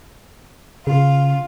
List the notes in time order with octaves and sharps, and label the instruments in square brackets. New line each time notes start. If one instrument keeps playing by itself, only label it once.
[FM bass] C#3 [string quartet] F4